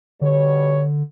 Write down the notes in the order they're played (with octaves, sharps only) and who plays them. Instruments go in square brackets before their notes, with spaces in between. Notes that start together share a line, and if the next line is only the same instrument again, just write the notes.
[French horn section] B2 G3 C#5 [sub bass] D3